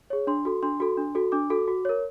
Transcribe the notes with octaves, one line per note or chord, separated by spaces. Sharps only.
G#4 C#5
D4 C6
F#4 A4
D4 C6
F#4 A4
D4
F#4 A4
D4 D6
F#4 A4
F#4
A#4 C#5